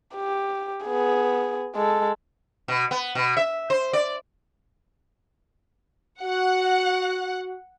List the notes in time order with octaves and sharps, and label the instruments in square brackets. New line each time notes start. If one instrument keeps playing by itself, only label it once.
[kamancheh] G4
B3 G#4
G#3 A4
[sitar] B2
B3
B2
E5
C5
D5
[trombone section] F#4 [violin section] F#5